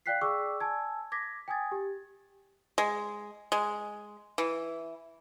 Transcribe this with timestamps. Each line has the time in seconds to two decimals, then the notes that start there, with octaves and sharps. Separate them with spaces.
0.06 D5 F5 G5 F#6 B6 C7
0.21 G#4 D5 G5 C#6 D6 E6
0.60 G#5 A5 E6 G#6
1.12 D6 G#6 A#6 B6
1.48 G5 G#5 D#6 G#6 A6
1.72 G4
2.78 G#3
3.52 G#3
4.38 E3